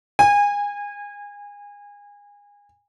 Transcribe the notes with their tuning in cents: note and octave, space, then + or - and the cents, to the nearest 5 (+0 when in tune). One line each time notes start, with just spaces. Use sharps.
G#5 -25